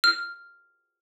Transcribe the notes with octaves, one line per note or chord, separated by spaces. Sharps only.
F6